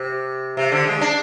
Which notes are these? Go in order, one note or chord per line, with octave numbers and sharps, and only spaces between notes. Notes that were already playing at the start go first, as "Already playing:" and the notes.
Already playing: C3
C3
D3
G#3
D4